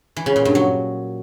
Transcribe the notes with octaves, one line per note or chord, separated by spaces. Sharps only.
E3
C#3
A#2
G2
F#3